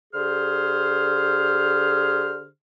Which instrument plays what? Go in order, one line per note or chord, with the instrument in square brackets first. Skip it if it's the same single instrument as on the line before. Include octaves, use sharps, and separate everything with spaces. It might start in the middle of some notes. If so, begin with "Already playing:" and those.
[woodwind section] D3 G4 G#4 C5 F6